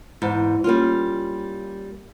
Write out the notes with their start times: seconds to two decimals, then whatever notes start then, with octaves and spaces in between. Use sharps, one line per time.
0.22 E2 G#2
0.64 G3 A#3 C#4 F4